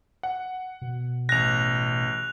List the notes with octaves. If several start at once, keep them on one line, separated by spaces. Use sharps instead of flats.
F#5
B2
A1 F#6 A#6 F7